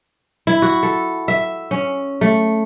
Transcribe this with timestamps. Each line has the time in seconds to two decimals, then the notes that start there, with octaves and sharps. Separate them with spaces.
0.47 E4
0.62 F#4
0.83 A4
1.28 E5
1.71 C#4
2.21 A3